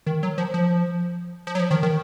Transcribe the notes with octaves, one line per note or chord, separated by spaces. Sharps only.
D#3
F#3
F3
F3
F3
F#3
F3
D#3
D#3